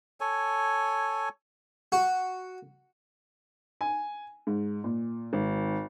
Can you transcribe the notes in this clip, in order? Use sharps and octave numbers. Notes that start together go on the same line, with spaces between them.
A4 C#5 G#5
F#4
G#5
G#2
A#2
G#1